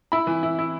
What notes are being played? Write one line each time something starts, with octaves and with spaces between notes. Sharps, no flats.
E4 B5
E3
E4
E4